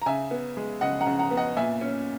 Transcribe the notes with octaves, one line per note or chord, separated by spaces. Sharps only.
A#5
C#3 E5 G#5
B3
G#3
C#3 D#5 F#5
F#5 A#5
C#3
F#5 A#5
B3
D#5 F#5
A#2 E5 G#5
C#4